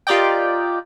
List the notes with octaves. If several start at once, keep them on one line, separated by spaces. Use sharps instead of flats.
F4 G4 A#4 D5 D#5 G5